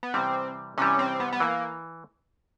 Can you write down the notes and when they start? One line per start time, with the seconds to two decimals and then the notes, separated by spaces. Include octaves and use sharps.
0.03 B3
0.14 C3 E3 G3 C4
0.78 C3 E3 G3 C#4
0.99 C4
1.20 B3
1.33 B3
1.40 E3 A#3